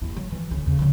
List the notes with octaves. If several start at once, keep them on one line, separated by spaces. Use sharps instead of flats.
D#2 E4
F#3
E3 F3
D2 C#4
D#2 C#3
C#3 F3